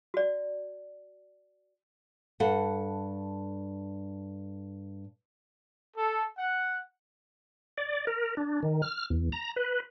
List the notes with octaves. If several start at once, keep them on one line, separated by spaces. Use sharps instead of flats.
F#4 D5
G2 A4 F#5
A4
F#5
D5
A#4
D4
D#3
F6
E2
A#5
B4